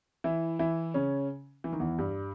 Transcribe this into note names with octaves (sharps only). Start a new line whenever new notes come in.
E3 E4
E3 E4
C#3 C#4
E3
D#3
E2 E3
G2 G3